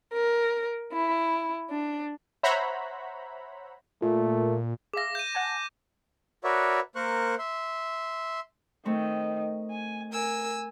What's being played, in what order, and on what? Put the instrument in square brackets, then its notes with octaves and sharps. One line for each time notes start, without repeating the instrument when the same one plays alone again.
[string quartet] A#4
E4
D4
[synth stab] C5 C#5 E5 F#5 A#5 B5
[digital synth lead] A#2 [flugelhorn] A3
[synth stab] G#4 E5 F5 [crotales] D6 A#6
[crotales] G6 D#7
[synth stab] F#5 G#5 A5
[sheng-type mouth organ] F#4 A#4 B4 C#5 D5 E5
A#3 A#4 C5 C#6 F#6
E5 C6
[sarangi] D#3 [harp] A3 C4
[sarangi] G#5
[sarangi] A#4 [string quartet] G#5 E6